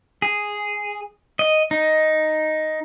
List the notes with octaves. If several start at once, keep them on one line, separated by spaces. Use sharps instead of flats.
G#4
D#5
D#4